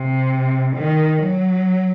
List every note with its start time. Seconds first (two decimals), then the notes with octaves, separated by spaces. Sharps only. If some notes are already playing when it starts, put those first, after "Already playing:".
Already playing: C3
0.76 D#3
1.22 F#3